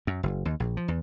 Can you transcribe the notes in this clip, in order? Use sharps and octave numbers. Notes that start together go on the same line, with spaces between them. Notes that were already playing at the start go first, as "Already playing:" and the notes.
F#2
F#1
D#2
A#1
F3
E2